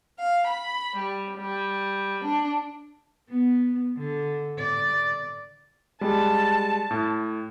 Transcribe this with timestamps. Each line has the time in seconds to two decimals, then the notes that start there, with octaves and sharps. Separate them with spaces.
0.18 F5
0.47 B5
0.95 G3
1.38 G3
2.24 D4
3.30 B3
3.97 D3
4.59 D5
6.01 G3 G#3 A5
6.91 A2